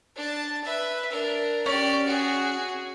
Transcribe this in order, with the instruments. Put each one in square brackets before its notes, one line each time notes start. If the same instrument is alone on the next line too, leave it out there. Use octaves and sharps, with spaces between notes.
[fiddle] D4 A5
B4 E5
D4 A#4
[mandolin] C#4 [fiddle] G4 D5
[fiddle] F#4 G#4